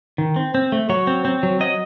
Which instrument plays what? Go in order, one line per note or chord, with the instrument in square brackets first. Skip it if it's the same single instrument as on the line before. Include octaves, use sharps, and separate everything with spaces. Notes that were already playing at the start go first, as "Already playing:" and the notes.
[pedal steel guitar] D#3
C4
C4
A3
F#3 C#5
C4
C4
F#3
F#3 D#5